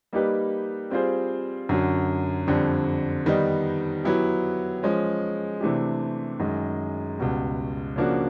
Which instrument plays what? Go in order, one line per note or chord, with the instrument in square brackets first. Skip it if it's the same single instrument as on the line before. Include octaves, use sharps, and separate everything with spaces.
[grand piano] G3 A#3 D#4 G4 B4
G3 C4 F4 G#4 C5
F#2 D3 F#3
F2 D3 G3
D#3 G3 B3 D#4
F#3 B3 E4 G4
F3 G#3 C#4
C3 E3 A3 D4 G4
F#2 D#3 G#3
C#2 B2 G3
C#3 F3 A#3 D4 F#4